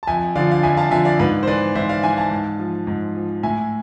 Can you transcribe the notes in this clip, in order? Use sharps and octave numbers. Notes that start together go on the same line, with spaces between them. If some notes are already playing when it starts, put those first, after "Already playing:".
A5
F2 E5 G#5
D3 F3 D5 F5
F5
F2 E5 G#5
F5 A5
D3 F3 E5 G#5
D5 F5
G#2 B4 D5
C5
E3 B4 D5
G#2 C5 E5
D5 F5
E3 E5 G#5
F5 A5
G#2
F3
G#2
F3
A2 E5 G#5